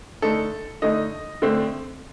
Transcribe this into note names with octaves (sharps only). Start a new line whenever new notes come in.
D3 A3 D#4 A4
D3 A3 D#4 D#5
D3 A3 C4